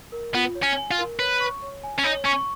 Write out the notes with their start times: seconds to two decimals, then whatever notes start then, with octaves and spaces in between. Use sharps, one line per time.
0.12 A#4
0.34 B3 F4
0.55 C#5
0.63 C#4
0.77 G#5
0.91 F4
0.98 A#4
1.19 B4 C#5
1.40 C#6
1.62 C#5
1.84 G#5
1.99 C#4
2.04 D#4 C#5
2.25 C#4 C#6